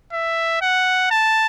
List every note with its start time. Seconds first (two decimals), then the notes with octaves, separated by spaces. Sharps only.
0.13 E5
0.62 F#5
1.11 A5